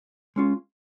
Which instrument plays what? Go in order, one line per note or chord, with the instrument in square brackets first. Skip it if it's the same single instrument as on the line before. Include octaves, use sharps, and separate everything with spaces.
[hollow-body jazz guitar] G#3 C#4 F4